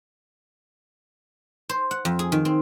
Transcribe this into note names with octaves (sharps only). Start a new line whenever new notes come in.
C5
F#5
F2
G#4
D#3
C4